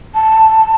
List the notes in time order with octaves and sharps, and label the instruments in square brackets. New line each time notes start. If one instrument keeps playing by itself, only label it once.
[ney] A5